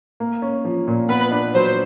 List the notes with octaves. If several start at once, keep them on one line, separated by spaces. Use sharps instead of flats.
A#3
C#4
F3
A#2
B3 B4
D4
F#3 C5